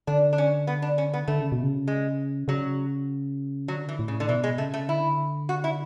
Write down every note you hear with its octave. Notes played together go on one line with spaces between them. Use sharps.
D3 D4
D4
C#4
B3
D4
C#4
B3
D3 A3
C#3
B2
C#3
G#3
C#3 F#3
D3 F#3
E3
A2
C#3
D3
B2 E3
G#3
C#3 A3
A3
D3 E4
F#4
E4